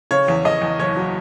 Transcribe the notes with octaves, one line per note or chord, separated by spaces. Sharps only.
C#3 C#5
E2
E2 D#5
E2
F#1 C#5
F#3